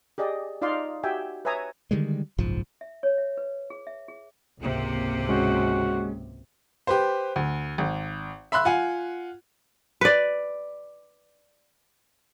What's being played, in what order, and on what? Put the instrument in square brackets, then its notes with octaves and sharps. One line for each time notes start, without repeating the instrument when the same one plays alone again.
[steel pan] G4 G#4 D5 D#5
D#4 F4 D5 D#5 F5 C6
F#4 G4 E5 G5 G#5
B4 C#5 E5 G#5 A#5 D#6
[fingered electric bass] D3 D#3 G3 G#3
F#1 B1 G#2 F3
[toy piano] E5
C#5
E5
B4
G#4
E5
G#4
[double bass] G#1 C#2 [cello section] C3 A#3
[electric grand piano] G#3 C#4 [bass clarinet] F#4
[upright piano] G4 B4 C5
D2
G#1
E5 B5 C6 E6 F#6
F4 F#5 G#5
[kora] B4 D5